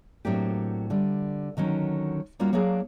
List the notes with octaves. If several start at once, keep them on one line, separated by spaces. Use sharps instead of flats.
A2 F#3 A#3 C4 D4 G4
D3 G3
D3 D#3 F#3 C#4
G3 A#3 C#4 F4 F#4
F#3 A#3 D4 G#4 F5